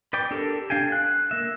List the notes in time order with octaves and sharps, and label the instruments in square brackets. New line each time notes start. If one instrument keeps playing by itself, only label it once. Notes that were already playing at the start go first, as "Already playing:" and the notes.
[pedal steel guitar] B4 D5 G5 D6
D4 G4 A4 A#4
D4 F5 G5 G#5
F#6
A#3 E5